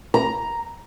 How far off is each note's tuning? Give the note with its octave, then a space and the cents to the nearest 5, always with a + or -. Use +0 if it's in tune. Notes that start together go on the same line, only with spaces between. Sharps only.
A#5 +5